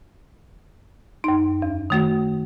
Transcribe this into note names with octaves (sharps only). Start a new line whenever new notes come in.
F#2 D#4
E2
D#3 A3 F#4